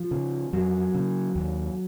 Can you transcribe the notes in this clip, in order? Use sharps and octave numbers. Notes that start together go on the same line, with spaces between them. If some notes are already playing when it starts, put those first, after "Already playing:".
Already playing: F3
C#3
F2 F#3
C#3
D#2